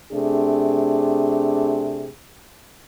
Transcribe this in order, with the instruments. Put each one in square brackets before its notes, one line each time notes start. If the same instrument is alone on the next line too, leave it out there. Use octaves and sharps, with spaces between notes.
[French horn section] C3 A3 D4 G#4